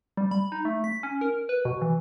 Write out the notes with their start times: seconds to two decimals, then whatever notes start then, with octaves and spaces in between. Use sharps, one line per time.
0.17 G3
0.31 B5
0.52 D#4
0.65 A3
0.84 B6
1.03 C#4
1.21 A#4
1.49 B4
1.65 B2
1.82 E3